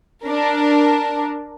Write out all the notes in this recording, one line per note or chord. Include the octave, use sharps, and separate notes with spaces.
D4 A#4